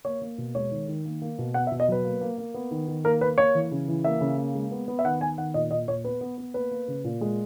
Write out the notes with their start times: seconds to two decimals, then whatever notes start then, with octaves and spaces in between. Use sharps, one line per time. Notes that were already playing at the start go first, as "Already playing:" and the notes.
0.05 A#3 C#5
0.21 A#3
0.38 B2
0.55 G#3 C#5
0.71 D#3
0.88 D#3
1.05 A#3
1.22 A#3
1.38 B2
1.54 B3 F#5
1.67 E5
1.71 B2
1.80 D#5
1.88 F#3 B4
2.04 A#3
2.21 A#3
2.38 A#3
2.54 B3
2.71 D#3
2.88 D#3
3.04 A#3 A#4
3.21 A#3 B4
3.38 A#3 C#5
3.55 E3
3.71 C#3
3.88 E3
4.04 A#3 E5
4.21 C#3
4.38 A#3
4.55 G#3
4.71 B3
4.88 B3
4.99 E5
5.05 D#3 F#5
5.21 B3 G#5
5.38 D#3 F#5
5.54 A#2 D#5
5.71 A#2 D#5
5.88 A#2 C#5
6.04 B3 B4
6.21 B3
6.38 B3
6.54 A#3 B4
6.71 A#3
6.88 C#3
7.04 A#2
7.21 G#3